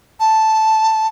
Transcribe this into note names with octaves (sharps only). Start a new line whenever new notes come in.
A5